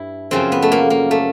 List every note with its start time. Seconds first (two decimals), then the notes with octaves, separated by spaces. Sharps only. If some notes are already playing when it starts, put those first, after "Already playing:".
Already playing: G2 E4
0.31 F#2 C#3 F3 C4
0.52 B3
0.62 A3
0.72 A#3
0.90 A#3
1.11 A3